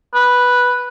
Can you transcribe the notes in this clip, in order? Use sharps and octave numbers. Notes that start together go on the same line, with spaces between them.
B4